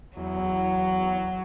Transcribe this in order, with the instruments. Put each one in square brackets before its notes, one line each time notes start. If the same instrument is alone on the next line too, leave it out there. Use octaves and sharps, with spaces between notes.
[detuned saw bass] E2 [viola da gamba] F#3